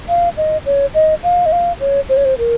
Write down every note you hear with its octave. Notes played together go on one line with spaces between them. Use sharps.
F5
D#5
C#5
D#5
F5
D#5
F5
C#5
C5
C#5
C5
A#4